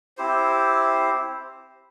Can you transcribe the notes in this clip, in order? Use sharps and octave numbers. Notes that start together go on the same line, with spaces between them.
C4 E4 G4 C5